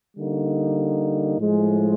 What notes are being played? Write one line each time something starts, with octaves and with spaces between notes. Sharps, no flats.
D3 G3 A#3 D#4
A2 F3 G#3